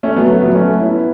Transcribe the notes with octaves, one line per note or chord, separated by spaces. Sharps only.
A3 C#4
F#3 B3
A3
F#3 B3
A3 C#4
B3 E4